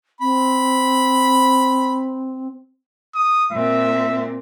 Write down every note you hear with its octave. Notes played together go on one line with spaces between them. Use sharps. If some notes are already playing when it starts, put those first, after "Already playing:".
C4 B5
D#6
A#2 C4 E5